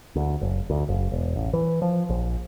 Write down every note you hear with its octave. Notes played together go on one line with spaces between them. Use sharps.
D2
F#1
D2
F#1
E1
A1
E3
F3
A#1